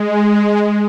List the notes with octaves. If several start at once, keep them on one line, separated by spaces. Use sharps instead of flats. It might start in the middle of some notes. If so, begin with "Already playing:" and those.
Already playing: G#3